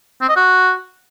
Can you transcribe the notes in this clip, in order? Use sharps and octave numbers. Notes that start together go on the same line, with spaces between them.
C4
D#5
F#4